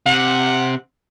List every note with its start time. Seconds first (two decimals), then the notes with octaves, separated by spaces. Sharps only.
0.06 C3 F#5